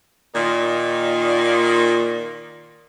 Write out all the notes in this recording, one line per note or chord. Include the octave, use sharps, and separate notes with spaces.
A#2 D#3